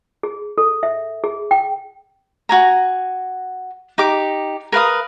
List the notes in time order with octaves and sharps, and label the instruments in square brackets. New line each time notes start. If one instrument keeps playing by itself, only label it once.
[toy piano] G#4
A4
E5
G#4
G5
[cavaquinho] F#4 G#5 A#5
D#4 G4 D6
A#4 B4 F5 D#6